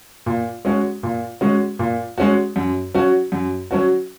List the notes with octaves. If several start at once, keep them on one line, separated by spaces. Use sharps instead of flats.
A#2
G#3 C#4 F#4
A#2
G#3 C#4 F#4
A#2
G#3 C#4 F#4
F#2
F#3 C#4 F#4
F#2
F#3 C#4 F#4